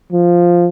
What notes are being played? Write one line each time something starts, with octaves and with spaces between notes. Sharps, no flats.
F3